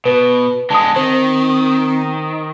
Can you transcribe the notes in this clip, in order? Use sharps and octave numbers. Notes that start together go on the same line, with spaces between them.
B2 B4
D3 G#3 A5 D#6
D#3 C4 C5